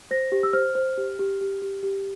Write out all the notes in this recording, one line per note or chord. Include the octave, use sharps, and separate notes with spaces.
C5 A#6
G4
E6
C5 F6
C5
G4
G4
G4
G4
G4